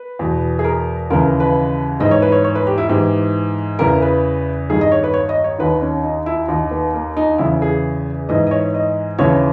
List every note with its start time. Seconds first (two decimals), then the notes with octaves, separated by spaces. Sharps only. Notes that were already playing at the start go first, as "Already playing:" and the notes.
Already playing: B4
0.19 E2 B2
0.59 G#4
0.64 A#4
1.10 D#2 C#3 E3 A#4
1.40 B4
2.00 G#2 E3 D#5
2.11 C#5
2.22 B4
2.32 C#5
2.44 C#5
2.55 B4
2.67 G4
2.78 E4
2.89 G#2 E3 G4
3.79 E2 C#3 E3 A#4
4.02 B4
4.70 G2 D#3 G#4
4.81 D#5
4.92 C#5
5.04 B4
5.14 C#5
5.29 D#5
5.44 C#5
5.59 D#2 D#3 B4
5.82 C#4
6.04 D#4
6.26 E4
6.48 D#2 D#3 D#4
6.71 B3
6.93 A#3
7.17 D#4
7.38 E2 C#3 E3 E4
7.62 G#4
8.29 G#2 E3 D#5
8.47 D#5
8.51 C#5
8.74 D#5
9.19 D#2 C#3 E3 C#5